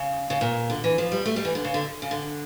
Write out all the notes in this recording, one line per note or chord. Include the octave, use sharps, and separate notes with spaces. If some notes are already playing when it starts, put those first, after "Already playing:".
Already playing: C#3
C#3
A#2
D3
E3
F3
G3
A3
G3
E3
D3
C#3
D3
C#3
D3